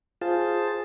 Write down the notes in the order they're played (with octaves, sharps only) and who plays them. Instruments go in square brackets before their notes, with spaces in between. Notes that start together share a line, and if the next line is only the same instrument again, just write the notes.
[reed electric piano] F4 [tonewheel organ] G#4 C5 A5